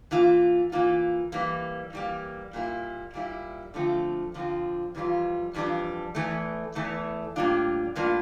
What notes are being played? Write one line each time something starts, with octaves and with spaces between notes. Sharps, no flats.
E3 A#3 F4
E3 A#3 F4
E3 G3 A#3
E3 G3 A#3
A#2 G3 A#3 E4
A#2 G3 A#3 E4
D3 F3 A3 C4 F4
D3 F3 A3 C4 F4
F2 E3 G3 D4 F4
F2 E3 G3 D4 F4
E2 E3 A3
E2 E3 A3
A2 G3 A#3 D4 F4
A2 G3 A#3 D4 F4